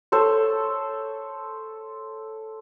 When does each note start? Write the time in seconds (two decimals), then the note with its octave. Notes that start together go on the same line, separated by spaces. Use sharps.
0.12 A4 C5 C#5